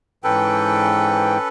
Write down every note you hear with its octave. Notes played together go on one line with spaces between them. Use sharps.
G#2 E3 C#4 A4 B4 G5